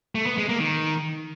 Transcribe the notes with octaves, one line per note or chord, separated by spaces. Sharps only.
A3
B3
G#3
A#3
D#3